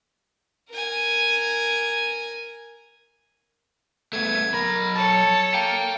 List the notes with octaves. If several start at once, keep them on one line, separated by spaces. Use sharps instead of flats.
A#4 G#5
A3 B3 G#6
F#3 A#4 B5
A4 C#5 A5
F5 G5 A#5